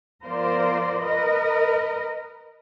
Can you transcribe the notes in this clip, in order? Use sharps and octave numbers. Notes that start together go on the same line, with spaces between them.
F3 B3 F4 A#4 C5 D5
A#4 B4 D#5